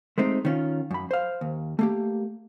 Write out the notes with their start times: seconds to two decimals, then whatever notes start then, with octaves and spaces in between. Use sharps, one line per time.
0.18 G#3 A3 C4 D#4
0.45 D#3 C#4 F4
0.91 F#2 B5
1.11 C5 F5
1.41 D#2
1.79 A3 A#3 G4